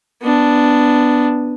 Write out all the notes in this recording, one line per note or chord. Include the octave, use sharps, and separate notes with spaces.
B3 D4